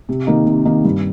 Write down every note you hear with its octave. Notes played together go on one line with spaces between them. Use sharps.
C3
D#3 A#3 D#4
C3
D#3 A#3 D#4
G2